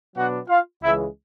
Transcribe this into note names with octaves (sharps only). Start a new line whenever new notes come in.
B2 F#3 B3 D4 F#4 F#5
F4 F5
C#2 C#3 E3 G#3 E4 E5